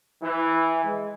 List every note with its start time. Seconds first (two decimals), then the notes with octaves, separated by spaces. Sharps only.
0.22 E3
0.85 G#3